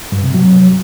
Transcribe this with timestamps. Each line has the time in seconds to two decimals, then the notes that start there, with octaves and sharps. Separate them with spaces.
0.12 G2
0.23 C3
0.34 F#3